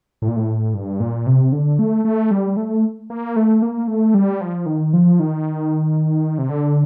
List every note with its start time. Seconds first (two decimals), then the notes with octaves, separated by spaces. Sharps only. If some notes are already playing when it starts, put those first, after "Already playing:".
0.22 A2
0.28 A#2
0.36 A2
0.74 G2
1.00 A#2
1.27 C3
1.52 D3
1.79 A3
2.05 A3
2.31 G3
2.57 A3
3.10 A#3
3.36 A3
3.62 A#3
3.88 A3
4.14 G3
4.41 F3
4.66 D#3
4.93 F3
5.20 D#3
6.38 C3
6.49 D3